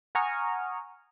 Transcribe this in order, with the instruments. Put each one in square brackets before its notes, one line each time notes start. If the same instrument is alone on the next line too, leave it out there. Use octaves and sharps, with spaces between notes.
[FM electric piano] F#5 G#5 A#5 C#6 D#6 F6